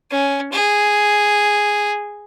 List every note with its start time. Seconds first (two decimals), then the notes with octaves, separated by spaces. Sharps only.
0.11 C#4
0.53 G#4